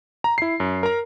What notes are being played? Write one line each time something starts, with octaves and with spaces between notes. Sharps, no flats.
A#5
E4 C7
F#2
A#4 A#5